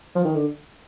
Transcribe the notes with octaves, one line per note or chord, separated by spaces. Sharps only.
F3
D#3
D3